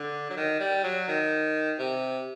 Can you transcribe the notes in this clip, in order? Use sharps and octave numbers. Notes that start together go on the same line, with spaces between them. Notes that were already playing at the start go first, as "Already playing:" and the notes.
Already playing: D3
F#3
D#3
G3
F#3
D#3
C3